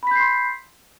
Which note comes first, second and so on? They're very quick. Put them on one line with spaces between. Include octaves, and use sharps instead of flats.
B5 B6 G6 C7 C6